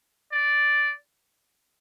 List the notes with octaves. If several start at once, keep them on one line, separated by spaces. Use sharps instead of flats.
D5